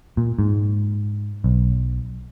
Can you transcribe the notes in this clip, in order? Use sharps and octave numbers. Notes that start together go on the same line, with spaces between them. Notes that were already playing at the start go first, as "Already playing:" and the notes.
A#2
G#2
B1